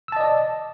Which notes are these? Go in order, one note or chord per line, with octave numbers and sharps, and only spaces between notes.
D5 D#5 A5 E6